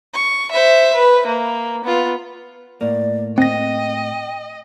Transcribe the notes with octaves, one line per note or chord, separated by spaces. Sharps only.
C#6
C5 E5
B4
A#3
B3 F4
A2 A#3 D5
C4 D#5 G5 A#6